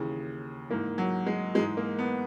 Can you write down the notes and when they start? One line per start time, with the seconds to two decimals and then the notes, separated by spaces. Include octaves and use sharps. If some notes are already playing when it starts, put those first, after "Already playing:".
Already playing: D#2 C#3 E3
0.70 G#2 E3 A#3
0.98 F#3
1.26 G#3
1.55 G#2 E3 G#3
1.77 A#3
1.98 B3